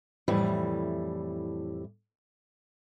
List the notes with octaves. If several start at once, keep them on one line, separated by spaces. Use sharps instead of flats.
F2 A2 E3 G3